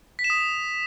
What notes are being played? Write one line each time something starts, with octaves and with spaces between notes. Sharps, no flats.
B6
E7
D#6